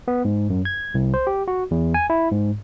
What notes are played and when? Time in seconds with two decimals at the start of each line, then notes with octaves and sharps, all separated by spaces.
0.08 B3
0.25 G#2
0.50 F#2
0.65 G#6
0.94 C2
1.14 C5
1.27 G4
1.48 F#4
1.71 E2
1.94 G#5
2.10 E4
2.31 G#2